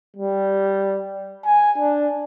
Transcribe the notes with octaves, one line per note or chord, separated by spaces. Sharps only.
G3
G#5
D4